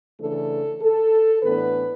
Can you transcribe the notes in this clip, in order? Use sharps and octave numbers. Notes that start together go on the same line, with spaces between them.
C#3 E3 A3 D4 A4
A4
A2 E3 B3 D4 B4